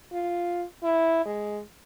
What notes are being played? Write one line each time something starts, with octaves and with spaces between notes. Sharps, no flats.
F4
E4
G#3